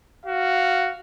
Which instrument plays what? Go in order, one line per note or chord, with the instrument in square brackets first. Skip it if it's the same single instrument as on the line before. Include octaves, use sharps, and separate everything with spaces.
[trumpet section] F#4 F5